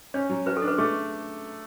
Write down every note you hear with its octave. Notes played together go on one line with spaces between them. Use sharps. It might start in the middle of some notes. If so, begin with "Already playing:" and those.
C#4 C#5
F#3
F#4 B4
A4
D4
B4
A3 G#4